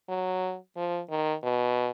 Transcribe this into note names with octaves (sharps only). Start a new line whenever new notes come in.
F#3
F3
D#3
B2